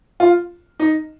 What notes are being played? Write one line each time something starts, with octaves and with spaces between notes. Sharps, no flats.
F4
D#4